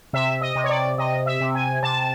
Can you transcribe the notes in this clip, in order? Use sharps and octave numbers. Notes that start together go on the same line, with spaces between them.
C3 E5
D#5
C3
C#5
D5
C3 D#5
E5
C3
G#5
C3 A5